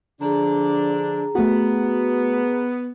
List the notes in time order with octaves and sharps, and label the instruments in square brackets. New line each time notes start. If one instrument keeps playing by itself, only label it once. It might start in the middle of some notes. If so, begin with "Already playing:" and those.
[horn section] D3 F3 D4 [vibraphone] G#4 A#5
[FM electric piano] A3 F#4 [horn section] B3